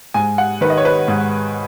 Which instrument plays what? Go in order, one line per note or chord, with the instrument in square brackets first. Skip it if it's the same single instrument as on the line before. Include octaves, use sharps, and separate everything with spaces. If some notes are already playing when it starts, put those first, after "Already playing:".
[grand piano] G#2 G#5
F#5
D#3 B4
D#5
C#5
B4
G#2